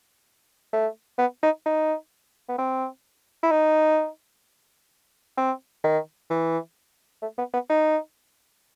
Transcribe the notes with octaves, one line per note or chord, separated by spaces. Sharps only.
A3
B3
D#4
D#4
B3
C4
E4
D#4
C4
D#3
E3
A3
B3
B3
D#4